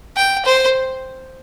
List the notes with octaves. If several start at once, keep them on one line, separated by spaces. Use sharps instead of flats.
G5
C5